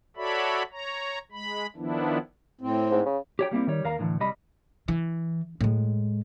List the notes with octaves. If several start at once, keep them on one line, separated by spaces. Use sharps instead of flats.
F#4 A4 C#5 D5 E5 B5
C#5 A#5
G#3 B5
D#3 F3 B3 D4 E4
A2 C4
G#2
C#3
G4 C#5 G5
G3 A#3 C4 E4
D#3 G3 C#5
D#2 A#4 F5 A#5
A2 D3 E3
C2 G3 D#5 B5
E3
A2 G#3